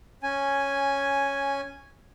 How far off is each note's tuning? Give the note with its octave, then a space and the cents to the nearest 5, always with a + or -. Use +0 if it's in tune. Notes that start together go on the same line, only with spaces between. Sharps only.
C#4 +0 G#5 +0